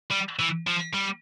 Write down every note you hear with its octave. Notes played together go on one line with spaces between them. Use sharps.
G3
E3
F3
G3